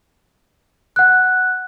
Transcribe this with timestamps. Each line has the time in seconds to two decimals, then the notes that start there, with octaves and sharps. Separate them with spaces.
0.96 F#5 F#6